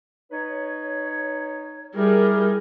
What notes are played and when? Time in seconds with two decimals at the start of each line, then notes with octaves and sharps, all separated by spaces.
0.31 D#4 B4 C#5
1.96 G3 E4 G4 G#4 A#4